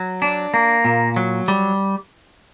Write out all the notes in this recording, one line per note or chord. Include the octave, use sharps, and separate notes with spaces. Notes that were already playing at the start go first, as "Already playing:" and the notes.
Already playing: F#3
D4
A#3
A#2
F#3
G3